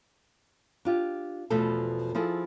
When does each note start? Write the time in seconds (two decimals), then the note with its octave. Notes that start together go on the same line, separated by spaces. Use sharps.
0.85 D4 F4 G4
1.50 E2 B2 F3 A3 A4
2.15 F3 C4 E4 G#4 A4